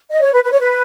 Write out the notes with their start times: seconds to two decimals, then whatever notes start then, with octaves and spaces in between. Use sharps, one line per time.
0.11 D#5
0.22 C#5
0.33 B4
0.44 B4
0.52 C#5
0.60 B4